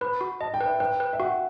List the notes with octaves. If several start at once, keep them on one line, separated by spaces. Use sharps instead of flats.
B4 B5
F#4
D#5 A5
G5
B4
E5
B4 G5
B4
E5
F#4 F#5